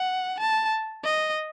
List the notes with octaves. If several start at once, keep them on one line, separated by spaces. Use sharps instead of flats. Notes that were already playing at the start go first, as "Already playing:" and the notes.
Already playing: F#5
A5
D#5